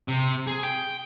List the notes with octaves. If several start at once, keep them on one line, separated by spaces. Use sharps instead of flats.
C3
G#4
G5